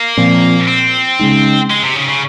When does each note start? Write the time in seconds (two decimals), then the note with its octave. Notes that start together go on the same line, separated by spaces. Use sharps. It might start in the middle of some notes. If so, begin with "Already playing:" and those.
Already playing: A#3
0.17 A#2 F3 C4
0.68 C4
1.20 C#3 G#3 D#4
1.70 G#3
1.83 C3
1.96 C#3
2.08 C#3